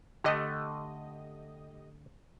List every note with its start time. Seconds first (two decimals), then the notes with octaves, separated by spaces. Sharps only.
0.24 D3 A3 G4 D#5